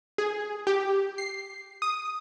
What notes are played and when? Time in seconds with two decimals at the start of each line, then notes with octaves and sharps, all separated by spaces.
0.18 G#4
0.67 G4
1.18 C7
1.82 D#6